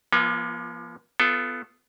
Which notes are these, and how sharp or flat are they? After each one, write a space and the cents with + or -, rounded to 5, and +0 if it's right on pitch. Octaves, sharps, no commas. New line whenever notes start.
F3 -35 A#3 +40 F4 +0
B3 +15 F4 -20 A4 +0